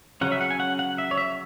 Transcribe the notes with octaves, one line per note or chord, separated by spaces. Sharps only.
C#3 F#3 C#4 F#5
E5
F#5
G#5
F#5
F#5
E5
C#5
E5